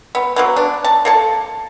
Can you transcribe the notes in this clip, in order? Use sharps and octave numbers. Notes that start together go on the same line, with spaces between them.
B3
F#3 A#3 B3
D4
A5
A#3 A4 A5